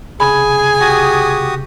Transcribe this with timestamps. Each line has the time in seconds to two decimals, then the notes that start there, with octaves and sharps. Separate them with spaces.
0.20 C2 C#3 G#4 G#5 B5
0.80 F#4 G4 D#6